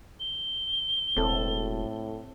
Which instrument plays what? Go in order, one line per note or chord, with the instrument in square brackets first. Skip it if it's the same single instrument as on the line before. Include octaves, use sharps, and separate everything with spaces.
[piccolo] G7
[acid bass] E1 [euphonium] A2 [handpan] C4 A4